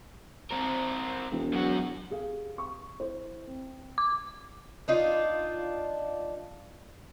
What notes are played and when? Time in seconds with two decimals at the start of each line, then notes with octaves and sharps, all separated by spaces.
0.51 C4 A#4
1.32 E1
1.53 F#2 F#4
2.10 G4 G#4 F5
2.58 C#6
3.00 E4 C5
3.47 C4
3.98 D6
4.88 D4 D#4 F4